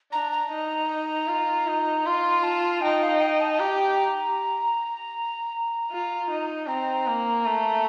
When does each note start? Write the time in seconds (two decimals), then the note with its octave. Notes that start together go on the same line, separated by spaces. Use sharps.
0.12 D4 A#5
0.32 A#5
0.51 D#4
1.28 F4
1.67 D#4
2.05 F4 C6
2.43 A5
2.82 D#4 G5
3.03 F5
3.21 G5
3.41 A5
3.54 A5
3.59 G4 A#5
5.91 F4
6.30 D#4
6.68 C4 A#5
7.07 A#3
7.46 A3